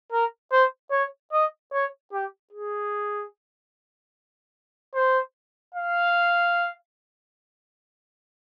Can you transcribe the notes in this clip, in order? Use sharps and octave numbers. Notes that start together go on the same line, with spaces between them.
A#4
C5
C#5
D#5
C#5
G4
G#4
C5
F5